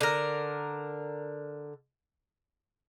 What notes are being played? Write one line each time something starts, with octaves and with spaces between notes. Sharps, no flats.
D3 A#4